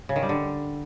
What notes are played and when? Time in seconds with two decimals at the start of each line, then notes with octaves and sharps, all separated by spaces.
0.09 C#3
0.16 D#3
0.22 G3
0.29 D3